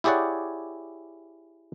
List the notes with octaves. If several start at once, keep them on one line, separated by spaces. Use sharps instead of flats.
E4 G4 G#4 C#5 D5 F#5